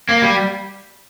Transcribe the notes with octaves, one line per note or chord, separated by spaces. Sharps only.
A#3
G3